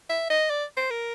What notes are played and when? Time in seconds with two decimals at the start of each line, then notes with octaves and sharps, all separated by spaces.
0.09 E5
0.30 D#5
0.50 D5
0.77 C5
0.91 A#4